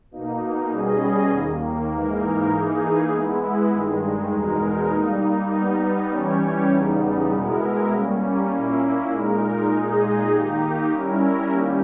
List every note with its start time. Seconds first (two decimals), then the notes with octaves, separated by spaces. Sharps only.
0.11 B2 A#3 D#4
0.71 B2 G3 C#4 G#4 D#5
1.31 D#2 D#3 A#3
1.91 G#2 E3 A#3 D#4 A#4
2.51 E3 A#3 D#4 G#4
3.11 G#3 B3 E4
3.70 G2 D#3 G#3
4.31 E2 B2 G#3 D#4 A#4
4.91 G3 A#3 D#4
5.51 G3 B3 D#4
6.11 E3 G3 C#4 G4 C#5
6.71 E2 C#3 G3 B3 D#4
7.31 B2 G#3 B3 E4 A#4
7.91 G3 A#3 C#4
8.51 A#2 A#3 C#4 E4
9.11 A#2 G#3 D#4 A#4
9.70 A#2 G#3 D#4 G#4 D#5
10.30 D#3 A#3 D#4 G4
10.91 G3 C#4 E4 A#4
11.51 D#3 G3 A#3 C#4 G4